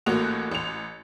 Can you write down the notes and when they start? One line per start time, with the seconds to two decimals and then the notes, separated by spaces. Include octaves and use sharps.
0.06 A1 A2 A#3 F#4 F7
0.51 A1 F7